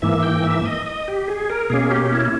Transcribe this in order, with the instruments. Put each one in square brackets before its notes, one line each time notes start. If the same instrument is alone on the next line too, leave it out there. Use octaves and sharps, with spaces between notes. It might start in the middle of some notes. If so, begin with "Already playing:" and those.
[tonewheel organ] G#2 E3 A#3 E5
G5
E5
D#5
D#5
G4
G#4
A#4
B2 A#3 C#4 G#4
G4
E4